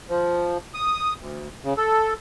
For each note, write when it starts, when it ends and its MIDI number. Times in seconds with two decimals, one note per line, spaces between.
0.09 0.58 53
0.74 1.14 87
1.19 1.48 38
1.64 1.74 49
1.77 2.14 69